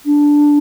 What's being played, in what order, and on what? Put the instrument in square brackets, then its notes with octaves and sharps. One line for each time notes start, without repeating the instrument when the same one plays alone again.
[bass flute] D4